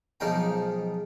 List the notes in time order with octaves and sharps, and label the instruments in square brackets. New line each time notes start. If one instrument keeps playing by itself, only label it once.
[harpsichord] B1 F3 G#3 D#4 A#4 G5